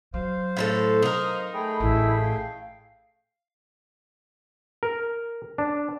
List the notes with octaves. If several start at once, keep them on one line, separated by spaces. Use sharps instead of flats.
F#3 C5 F5
A2 E4 A4
D#4 A#4 D#6
A3 G#4 G5 B5
A1 E4
F5
A#4
D4